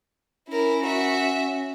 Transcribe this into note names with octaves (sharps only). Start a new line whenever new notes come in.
C#4 E4 A#4
F#4 E5